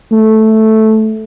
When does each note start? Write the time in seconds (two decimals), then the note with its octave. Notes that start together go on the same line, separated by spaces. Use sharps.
0.12 A3